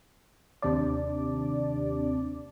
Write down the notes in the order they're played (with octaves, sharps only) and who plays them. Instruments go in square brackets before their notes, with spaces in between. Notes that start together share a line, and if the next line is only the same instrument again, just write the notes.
[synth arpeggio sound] D#2 C3 D4 D5